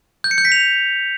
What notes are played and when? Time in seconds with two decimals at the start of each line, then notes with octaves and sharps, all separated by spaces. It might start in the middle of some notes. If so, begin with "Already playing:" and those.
0.24 G6
0.31 C#7
0.38 G6
0.45 B6
0.52 F7